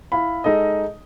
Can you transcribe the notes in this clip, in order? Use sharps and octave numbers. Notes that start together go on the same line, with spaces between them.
E4 F5 B5
G#3 D#4 A4 D#5